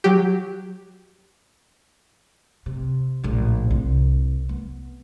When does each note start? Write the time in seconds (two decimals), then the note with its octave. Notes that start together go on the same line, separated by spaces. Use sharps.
0.04 F#3 G4
2.66 C3
3.24 A#1 A2
3.70 C2
4.49 B3